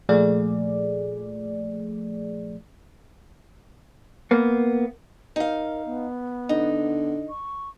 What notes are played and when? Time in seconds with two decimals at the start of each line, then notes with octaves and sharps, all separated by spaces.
0.09 A#2 F3 A3 G#4 D5
4.31 A#3 B3
5.36 D#4 A#4 F5
5.85 B3
6.49 D3 D#4
7.30 C#6